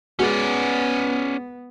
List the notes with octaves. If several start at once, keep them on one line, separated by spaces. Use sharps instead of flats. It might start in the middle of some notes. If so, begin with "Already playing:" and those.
G#3 B3 C#4 F#4 D5